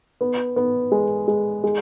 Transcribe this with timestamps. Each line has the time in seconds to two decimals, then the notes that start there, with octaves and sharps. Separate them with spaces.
0.21 B3
0.56 B3
0.92 G#3
1.28 G#3
1.64 G#3